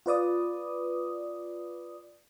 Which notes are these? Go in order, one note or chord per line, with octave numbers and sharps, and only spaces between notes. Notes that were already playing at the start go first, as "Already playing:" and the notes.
F4 B4 D5 D#6